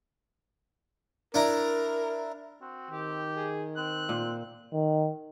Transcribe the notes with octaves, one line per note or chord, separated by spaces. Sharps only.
D4 E4 A#4 A#5
C4 F#4
D#3 G4
G#4
C4 F#6
A#2
D#3